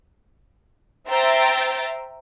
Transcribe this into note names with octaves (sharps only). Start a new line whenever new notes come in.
C5 E5 G5 A#5 A6